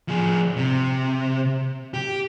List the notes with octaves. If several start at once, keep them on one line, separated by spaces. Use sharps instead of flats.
F3 G#4
C3
G4